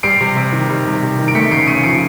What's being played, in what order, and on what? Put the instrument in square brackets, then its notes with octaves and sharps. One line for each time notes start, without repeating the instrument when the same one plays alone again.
[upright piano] G3 C7 D7
C3
C3
D#3
G3
C3
C3
D#3
D7
A3 B6 C#7
C#3 C7 D7
C#3 C#7 D#7
F3 C7 D7